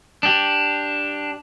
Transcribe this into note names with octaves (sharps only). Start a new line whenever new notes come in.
D4 G4